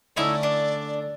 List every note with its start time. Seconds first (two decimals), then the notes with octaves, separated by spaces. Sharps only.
0.17 D3 A3 C#4 D#4 E4 D5 E5
0.43 D4